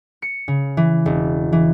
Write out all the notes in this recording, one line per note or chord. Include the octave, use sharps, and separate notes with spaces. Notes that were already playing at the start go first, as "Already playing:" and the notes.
C#7
C#3
E3
E1
E3